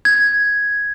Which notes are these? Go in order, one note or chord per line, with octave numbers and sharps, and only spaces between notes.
G#6